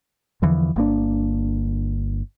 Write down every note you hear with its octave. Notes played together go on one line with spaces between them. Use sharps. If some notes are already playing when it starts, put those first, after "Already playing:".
E2 D3 E3 F3
G1 A#3 D4